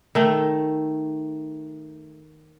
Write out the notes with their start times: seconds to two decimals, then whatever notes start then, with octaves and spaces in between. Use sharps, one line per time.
0.15 D#3 A3